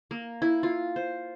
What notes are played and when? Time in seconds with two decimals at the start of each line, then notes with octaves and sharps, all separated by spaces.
0.11 A#3
0.42 E4
0.63 F4
0.96 C5